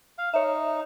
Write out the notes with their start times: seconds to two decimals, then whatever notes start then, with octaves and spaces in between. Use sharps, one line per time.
0.18 F5
0.34 D#4 C#5 E5